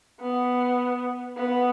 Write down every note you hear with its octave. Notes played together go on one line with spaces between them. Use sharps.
B3
B3